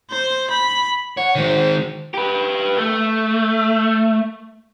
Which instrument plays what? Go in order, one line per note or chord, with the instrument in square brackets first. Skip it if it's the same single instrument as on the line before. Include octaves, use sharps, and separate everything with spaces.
[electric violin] C5
B5
[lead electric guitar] C#5 [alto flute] F#5
[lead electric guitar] D#3 G#3 [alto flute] C5
[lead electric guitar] G4 B4
A3